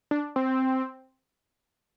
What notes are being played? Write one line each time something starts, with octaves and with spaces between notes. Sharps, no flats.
D4
C4